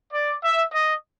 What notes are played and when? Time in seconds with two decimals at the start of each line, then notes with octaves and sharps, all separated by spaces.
0.13 D5
0.43 E5
0.72 D#5